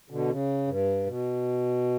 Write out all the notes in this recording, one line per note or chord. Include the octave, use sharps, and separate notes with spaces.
B2 D3
C#3
G2
B2